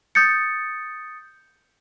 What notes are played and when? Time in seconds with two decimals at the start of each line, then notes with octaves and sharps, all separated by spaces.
0.15 D#6 G6 A6 C#7